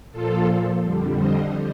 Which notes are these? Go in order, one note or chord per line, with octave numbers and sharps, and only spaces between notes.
A#2 F3 F4 A4
F2 D3 G3
C5 D#5